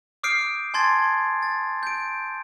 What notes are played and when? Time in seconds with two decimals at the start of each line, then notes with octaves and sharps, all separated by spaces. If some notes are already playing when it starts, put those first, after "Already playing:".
0.23 D6 D#6 F6 G6 C7 D7
0.74 G#5 A5 C6 G#6 A6
1.43 A6
1.83 G6 D7